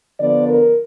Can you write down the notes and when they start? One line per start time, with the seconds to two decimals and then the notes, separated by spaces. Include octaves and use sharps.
0.20 D3 F3 B3 D5
0.48 A#4